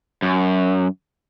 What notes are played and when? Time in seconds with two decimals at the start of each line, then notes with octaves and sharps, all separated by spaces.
0.22 F#2